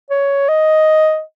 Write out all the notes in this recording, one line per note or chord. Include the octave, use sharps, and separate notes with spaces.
C#5
D#5